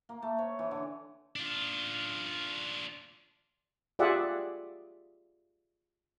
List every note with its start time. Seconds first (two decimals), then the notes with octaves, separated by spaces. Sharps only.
0.09 A#3
0.22 A3
0.38 C#5
0.59 E3
0.71 D3
1.36 D4 F4
3.99 F4 G4 G#4 D5 E5 F#5